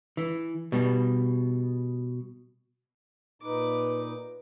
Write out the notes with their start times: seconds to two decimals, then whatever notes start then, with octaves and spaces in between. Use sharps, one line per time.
0.17 E3
0.72 B2 G3
3.42 A#2 D#4 B4 D6